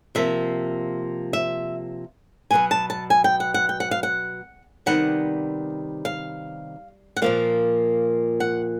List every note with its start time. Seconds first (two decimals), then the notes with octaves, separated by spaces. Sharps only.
0.15 C3 F3 A#3 E5
1.33 E5
2.51 B2 F#3 B3 G#5
2.71 A5
2.90 A5
3.10 G#5
3.24 G5
3.40 F#5
3.54 F#5
3.69 G5
3.80 F#5
3.91 F5
4.03 F#5
4.86 C3 D#3 G3 B3 F#5
6.05 F5
7.17 F#5
7.22 A#2 F3 A#3 F5
8.40 F#5